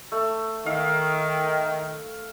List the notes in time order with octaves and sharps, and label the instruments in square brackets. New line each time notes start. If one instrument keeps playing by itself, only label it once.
[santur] A3
[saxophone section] D#3 [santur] F5